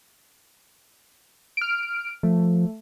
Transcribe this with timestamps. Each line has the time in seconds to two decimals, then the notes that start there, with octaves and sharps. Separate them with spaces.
1.57 F6 D7
2.23 F3 A3